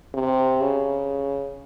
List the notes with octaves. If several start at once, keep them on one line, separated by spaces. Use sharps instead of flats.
C3
C#3